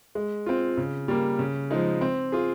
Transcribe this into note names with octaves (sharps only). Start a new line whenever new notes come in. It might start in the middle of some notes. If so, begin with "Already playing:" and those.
G#3
C4 F4
C#3
G3 A#3
C#3
F3 G#3 D#4 G#4
C4
F4 G#4